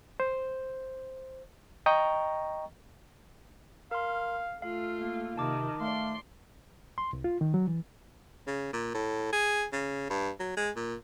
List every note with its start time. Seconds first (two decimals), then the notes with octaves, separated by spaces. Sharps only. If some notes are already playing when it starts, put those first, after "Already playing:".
0.20 C5
1.86 D#5 G5 A#5 C#6
3.91 A#4 F5 C6
4.62 A3 F4 F5
5.00 A#3
5.38 C3 D#3 A5 D6
5.81 A3 D5 F5 C6
6.98 C6
7.13 C2
7.24 F4
7.41 D#3
7.54 F#3
7.68 E3
8.47 C#3
8.73 A#2
8.94 A2
9.33 G#4
9.73 C#3
10.10 G2
10.40 F#3
10.57 G#3
10.76 A#2